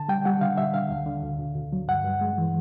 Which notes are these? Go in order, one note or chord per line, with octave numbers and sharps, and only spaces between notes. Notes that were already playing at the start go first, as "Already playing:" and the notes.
Already playing: D3 A5
G3 G5
G3 F#5
D3 F5
G3 E5
D3 F5
D2
D3
D2
D2
D2
F#3
G2 F#5
G2
G#3
E3